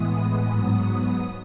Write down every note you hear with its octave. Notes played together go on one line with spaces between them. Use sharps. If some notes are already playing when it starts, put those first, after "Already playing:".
Already playing: A2 E3 G#3 B3 D#6
G#2 F#3 B3